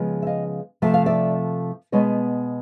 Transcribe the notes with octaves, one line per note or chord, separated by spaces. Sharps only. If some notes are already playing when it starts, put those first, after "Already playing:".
Already playing: C#3 F3 G#3 B3
E5
D#5 F5
C3 F3 A3 E5
F5
D5 E5
B2 G#3 B3 C#5 D#5